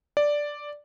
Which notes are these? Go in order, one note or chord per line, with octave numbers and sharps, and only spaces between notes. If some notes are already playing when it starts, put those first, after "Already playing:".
D5